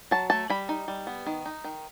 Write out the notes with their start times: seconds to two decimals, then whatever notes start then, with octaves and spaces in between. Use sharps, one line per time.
0.11 F#3 A5
0.30 A3 A5
0.50 G3 B5
0.69 D#4
0.88 G3
1.07 B3
1.26 D#3
1.46 D#4
1.64 D#3